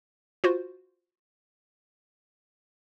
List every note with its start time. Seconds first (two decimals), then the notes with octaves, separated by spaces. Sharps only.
0.44 F4 F#4 C5